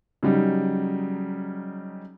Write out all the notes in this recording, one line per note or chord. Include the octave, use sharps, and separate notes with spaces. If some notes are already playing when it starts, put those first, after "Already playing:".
C#3 F#3 G3 D#4